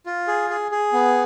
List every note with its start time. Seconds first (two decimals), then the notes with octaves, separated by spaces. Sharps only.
0.06 F4
0.28 G#4
0.50 G#4
0.72 G#4
0.93 B3